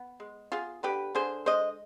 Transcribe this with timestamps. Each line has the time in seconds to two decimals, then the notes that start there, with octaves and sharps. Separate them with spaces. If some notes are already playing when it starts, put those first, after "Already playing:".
Already playing: B3
0.20 G#3
0.52 B3 F4 G#4
0.83 D3 G4 B4
1.15 D3 G#4 C5
1.46 G#3 C5 D#5